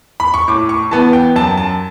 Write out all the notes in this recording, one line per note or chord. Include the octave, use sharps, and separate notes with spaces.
B5
C#6
A2 D6
C#6
E3 B3 A5
G5
F#2 A5
A5